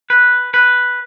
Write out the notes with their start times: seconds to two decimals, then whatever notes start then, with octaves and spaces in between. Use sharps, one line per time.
0.10 B4
0.54 B4